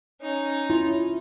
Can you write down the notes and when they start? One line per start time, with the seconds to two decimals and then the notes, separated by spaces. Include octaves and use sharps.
0.21 C#4 D#4
0.70 E4 F4